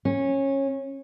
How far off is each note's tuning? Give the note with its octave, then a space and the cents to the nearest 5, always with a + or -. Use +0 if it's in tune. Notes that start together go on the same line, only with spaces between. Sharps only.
C#4 -20